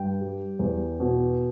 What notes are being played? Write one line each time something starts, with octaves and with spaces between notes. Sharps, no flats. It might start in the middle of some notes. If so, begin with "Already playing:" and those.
Already playing: G2 G5
G3
E2
B2